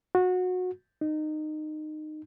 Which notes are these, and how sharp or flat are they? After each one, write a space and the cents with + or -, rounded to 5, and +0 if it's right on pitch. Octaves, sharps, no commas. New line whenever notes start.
F#4 -20
D#4 -20